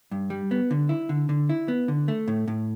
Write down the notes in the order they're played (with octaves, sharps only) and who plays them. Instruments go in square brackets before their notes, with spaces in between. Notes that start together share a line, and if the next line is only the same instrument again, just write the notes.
[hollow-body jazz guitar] G2
G3
B3
D3
E4
D3
D3
E4
B3
D3
A3
A2
A2